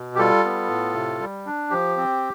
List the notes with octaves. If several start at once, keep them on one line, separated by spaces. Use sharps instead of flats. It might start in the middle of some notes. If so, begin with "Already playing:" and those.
Already playing: B2
G4
G3 F4 A4
B3
A2
C3
G3
D4
F3 G4
C4